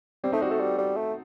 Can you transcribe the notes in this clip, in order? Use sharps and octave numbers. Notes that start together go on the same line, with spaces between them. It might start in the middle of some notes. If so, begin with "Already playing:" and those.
G3 C4
A3 D#4
G3 F#4
A3 A4
G3
G3
A3